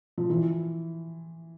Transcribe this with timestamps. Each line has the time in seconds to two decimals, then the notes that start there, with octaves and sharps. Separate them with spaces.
0.18 F3
0.30 E3